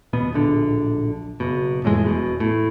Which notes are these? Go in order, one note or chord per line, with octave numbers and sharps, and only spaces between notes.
D#1 B2 B3
D1 A#1 D3
F#1 B2
F2 A2 E3 G#3
E1 B2
A2